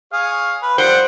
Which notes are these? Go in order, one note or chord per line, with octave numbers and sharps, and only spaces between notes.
G#4 C#5 F5
B4
F3 G3 C5 F#5 G5